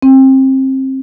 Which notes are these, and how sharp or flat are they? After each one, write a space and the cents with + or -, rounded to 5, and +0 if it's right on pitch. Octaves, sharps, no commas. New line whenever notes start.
C4 +25